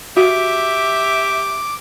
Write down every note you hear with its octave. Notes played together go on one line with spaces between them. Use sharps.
F#4 G4 E5 D6